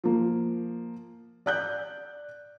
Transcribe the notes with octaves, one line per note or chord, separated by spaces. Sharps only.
F3 A#3
D5 F#6 G6